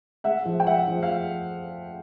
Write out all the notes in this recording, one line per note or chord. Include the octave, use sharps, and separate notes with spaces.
G#3 E5 F#5
F3
G5
G#3 E5 F#5
F3
F5